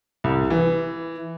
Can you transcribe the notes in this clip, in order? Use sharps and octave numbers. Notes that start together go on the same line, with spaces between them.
C2
E3